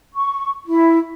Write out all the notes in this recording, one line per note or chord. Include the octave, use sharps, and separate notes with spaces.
C#6
E4